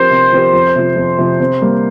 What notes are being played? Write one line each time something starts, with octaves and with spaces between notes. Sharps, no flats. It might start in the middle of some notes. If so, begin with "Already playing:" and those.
Already playing: F3 C4 G4 A#4 C5
C3
F3 C4 G4 A#4
F2
C3 F3
F2
C3 F3
C3
G3 A#3